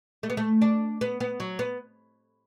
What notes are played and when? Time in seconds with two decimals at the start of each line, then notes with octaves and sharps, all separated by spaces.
0.23 A3
0.30 B3
0.37 A3
0.62 D4
1.01 B3
1.20 B3
1.40 F#3
1.59 B3